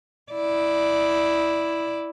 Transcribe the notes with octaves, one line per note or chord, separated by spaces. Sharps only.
E4 D5